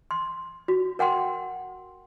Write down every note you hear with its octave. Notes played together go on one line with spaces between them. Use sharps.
C6
F#4
A#4 F#5 G5 C6